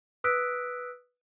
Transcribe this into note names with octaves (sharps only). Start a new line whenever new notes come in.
B4 D#6 E6 F#6 B6 D7